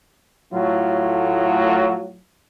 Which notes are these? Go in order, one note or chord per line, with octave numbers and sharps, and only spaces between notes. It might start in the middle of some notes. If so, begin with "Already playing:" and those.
A2 F#3 A3 F4